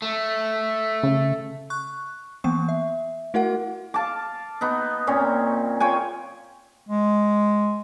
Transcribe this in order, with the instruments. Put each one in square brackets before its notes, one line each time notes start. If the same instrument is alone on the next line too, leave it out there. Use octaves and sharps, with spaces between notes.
[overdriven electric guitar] A3
[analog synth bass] C#3
[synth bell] C#6 F#6
E3 A#3 B3 C#6
E5
A3 E4 F#4 A#4 F#5
[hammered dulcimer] F5 A5 D6
B3 D#4
A#2 C4 C#4
F4 C#5 G5 G#5
[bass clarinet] G#3